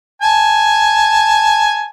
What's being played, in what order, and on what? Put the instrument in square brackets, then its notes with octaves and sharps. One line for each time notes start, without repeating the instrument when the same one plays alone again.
[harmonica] G#5 A5